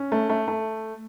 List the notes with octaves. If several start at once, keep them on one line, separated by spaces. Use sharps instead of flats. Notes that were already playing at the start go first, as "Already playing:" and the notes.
Already playing: C#4
A3
A3
A3